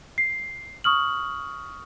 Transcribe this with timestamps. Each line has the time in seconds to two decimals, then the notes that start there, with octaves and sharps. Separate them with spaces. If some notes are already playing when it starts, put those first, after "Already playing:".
0.18 C7
0.84 C#6 D#6 F6 F#7